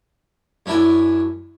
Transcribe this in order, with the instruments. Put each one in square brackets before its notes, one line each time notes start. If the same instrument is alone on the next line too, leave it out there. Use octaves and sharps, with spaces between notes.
[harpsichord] F#2 C#4 D4 E4 E5 G#5